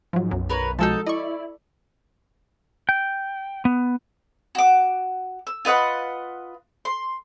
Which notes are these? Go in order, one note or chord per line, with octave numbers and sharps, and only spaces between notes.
G#2 F3 F#3
B1 F#2
A#4 B4 C#5
F3 G#3 D#4 F#4 A4 A5
E4 D5 D#5 C#6
G5
B3
F#4 D6
E6
F4 B4 D#5 F#5
C6